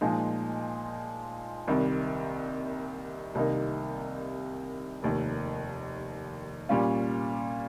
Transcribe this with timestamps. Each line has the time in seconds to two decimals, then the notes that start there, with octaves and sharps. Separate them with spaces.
0.01 A#2 F3 G#3 D#4
1.68 C2 C3 D#3 G3
3.35 C2 C3 D#3 A#3 D#4
5.02 F1 D#2 D#3
6.69 A#2 G3 C#4 F4